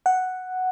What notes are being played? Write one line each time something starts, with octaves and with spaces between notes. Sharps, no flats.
F#5